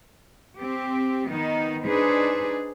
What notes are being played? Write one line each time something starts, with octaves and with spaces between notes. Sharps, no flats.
C4 G4
D#3 B3 D#4
D4 D#4 G#4 B4 C5